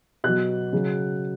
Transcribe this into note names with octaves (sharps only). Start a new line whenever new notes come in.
B2 F#3 F#6
C#3 F#3